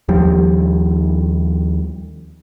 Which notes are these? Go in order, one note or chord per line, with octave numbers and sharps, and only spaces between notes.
D#2 F3 G3